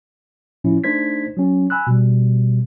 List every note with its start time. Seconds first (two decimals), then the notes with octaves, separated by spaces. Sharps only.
0.64 A2 F3 C#4 E4
0.84 A3 D4 D#4 C5 G#6 B6
1.37 F#3 C#4
1.70 G#5 B5 E6 F#6
1.87 B2 G3